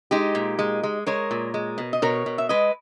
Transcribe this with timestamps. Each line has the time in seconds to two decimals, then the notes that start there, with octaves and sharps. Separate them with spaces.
0.11 G#3 D#4 G4
0.35 A#2
0.59 G#3
0.83 G#3
1.06 G#3 A#4 C#5
1.31 A#2
1.54 G#3
1.78 B2
1.93 D#5
2.02 B2 A#4 C#5
2.26 B2
2.38 E5
2.49 G#3 B4 D#5